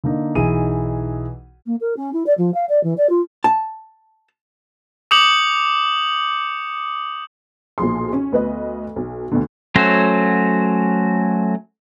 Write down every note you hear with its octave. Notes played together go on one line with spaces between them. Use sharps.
D3 A#3 D#4
B1 E3 D#4 G#4 D#7
A#3
A#4
C#4
E4
D5
F3
F5
D5
E3
D5
F4
A5
D6 D#6 G6 C#7 F#7
B1 A#2 F3 G#4 C6
C#4
D2 B3 B4 D#5
B1
D2 B2 D3
F#3 A3 C#4 F#4 C5